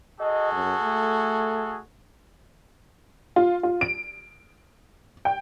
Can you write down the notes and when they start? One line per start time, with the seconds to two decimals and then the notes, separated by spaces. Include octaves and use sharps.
0.21 F#4 G#4 A4 D#5
0.52 F#2
0.83 A3
3.36 F4
3.63 F4
3.81 D7
5.25 G5